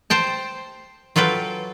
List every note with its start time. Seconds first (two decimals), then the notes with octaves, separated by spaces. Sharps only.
0.10 C5 G5 A5
1.16 F#3 F4 A4 B4 G5